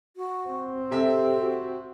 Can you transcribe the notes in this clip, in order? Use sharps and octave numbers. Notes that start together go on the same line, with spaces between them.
F#4
C4
C3 G4 A4 E5
F#4